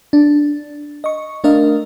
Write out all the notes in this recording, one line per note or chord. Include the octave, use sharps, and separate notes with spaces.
D4
D#5 C#6
A3 D4 A#4 D#5 F5